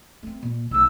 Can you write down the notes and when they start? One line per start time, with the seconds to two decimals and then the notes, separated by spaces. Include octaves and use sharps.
0.23 A3 C4
0.43 A#2
0.71 B1 A3 E6